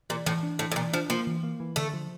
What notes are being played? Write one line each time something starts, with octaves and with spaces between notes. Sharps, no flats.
A#2 E3
A2 E3
D4
A2 E3
A2
A#2 E3
F3 D4
F3 A#3
E3
A#3
E3
D3 A3
F3